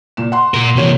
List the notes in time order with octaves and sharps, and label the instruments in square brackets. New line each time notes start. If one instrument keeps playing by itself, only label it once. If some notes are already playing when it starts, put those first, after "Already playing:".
[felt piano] A#2 E7
F#5 C6
[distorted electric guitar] A#2 A#4
[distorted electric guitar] C3 E3 [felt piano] A#3 F#4 C#5